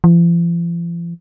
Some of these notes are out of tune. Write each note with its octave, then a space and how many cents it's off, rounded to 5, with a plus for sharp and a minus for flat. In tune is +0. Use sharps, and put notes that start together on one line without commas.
F3 -45